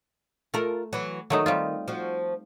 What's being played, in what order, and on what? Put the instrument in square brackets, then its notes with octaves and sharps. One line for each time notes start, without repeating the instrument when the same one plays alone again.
[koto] A3 [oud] F4 A#4
[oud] E3 F#3
[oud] D#3 [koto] F#3 A3 D#4
[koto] G3 C4 F4
[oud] F3 F#4